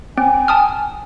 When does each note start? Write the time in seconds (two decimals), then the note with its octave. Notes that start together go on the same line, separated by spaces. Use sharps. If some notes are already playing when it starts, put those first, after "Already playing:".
0.18 C4 G5 G#5
0.48 A5 D#6 F6